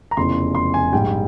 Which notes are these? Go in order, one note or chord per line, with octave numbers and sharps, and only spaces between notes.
A#5
F1 E2 C#3 F3 C6
C6
G#5
A#1 G#2 G3 G5